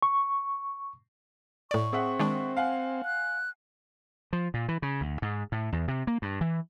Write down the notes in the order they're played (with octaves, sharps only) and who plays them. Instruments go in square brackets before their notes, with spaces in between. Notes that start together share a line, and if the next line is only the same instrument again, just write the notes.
[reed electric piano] C#6
[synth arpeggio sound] A2 D5 [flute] C#6
[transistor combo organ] C4 [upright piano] G#4 E5 F#5
[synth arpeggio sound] D#3 G#3 D4
[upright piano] F5 F#5 G#5
[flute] F#6
[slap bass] F3
A#2
E3
C#3
D2
G#2
A2
E2
C3
A#3
G2
E3